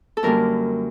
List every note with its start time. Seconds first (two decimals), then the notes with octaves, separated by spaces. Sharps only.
0.17 A4
0.23 F#2 D3 G3 A#3 A#4